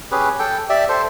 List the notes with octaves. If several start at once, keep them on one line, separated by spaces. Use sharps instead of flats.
C#4 G4 G#4 B4
A4 G5
G4 D5 E5
A4 C5